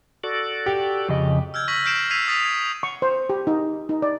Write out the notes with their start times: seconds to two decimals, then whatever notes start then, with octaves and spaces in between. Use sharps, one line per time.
0.24 F#4 A4 D5
0.66 G4
1.09 F2 C#3 D#5
1.54 E6 F6 G6 G#6
1.68 C#6 E6 A#6 B6 F#7
1.85 F6 G6 C7 D7 E7
2.10 E6 G#6 B6 C7 D#7 F7
2.28 D#6 A6 B6 D#7 F7
2.45 G#6
2.83 C#6
3.02 C5
3.30 G4
3.47 D#4
3.89 D#4
4.02 D5